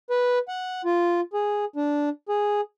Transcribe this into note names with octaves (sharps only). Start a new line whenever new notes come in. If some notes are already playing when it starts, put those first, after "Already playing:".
B4
F#5
F4
G#4
D4
G#4